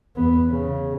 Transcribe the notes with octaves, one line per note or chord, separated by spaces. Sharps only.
E2 B3
C#3